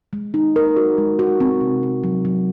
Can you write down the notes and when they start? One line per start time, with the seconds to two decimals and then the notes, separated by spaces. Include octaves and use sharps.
0.13 G#3
0.34 D#4
0.56 A#4
0.76 F#4
0.98 G#3
1.19 F#4
1.40 C4
1.61 C3
1.83 C4
2.04 F#3
2.25 F#3